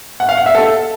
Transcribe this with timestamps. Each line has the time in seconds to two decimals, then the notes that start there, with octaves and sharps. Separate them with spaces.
0.20 F#5
0.29 F5
0.37 F#5
0.46 E5
0.55 A4